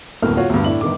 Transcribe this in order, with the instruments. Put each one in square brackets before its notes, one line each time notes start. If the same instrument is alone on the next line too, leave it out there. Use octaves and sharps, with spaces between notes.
[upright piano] D#1 D2 A2 A#3 B3 F6
F4 F#4 C#5
D2 G2
A2 D4 E4 F#7
G1 D#3 D6